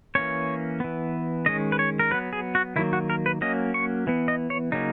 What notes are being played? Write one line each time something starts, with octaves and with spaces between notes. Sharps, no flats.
E3 A#3 C#4 C#5
E3 B3
D#3 G#3 C#4 D#5
B4
C#5
A#4
F#3 B3 B4
G#4
F#4
D#3 F#3 A#3 E4
F#4
A#4
B4
F#3 A#3 C#4 D#5
C#6
E3 B3
D#5
C#5
C#3 F#3 A#3 C#4 D#4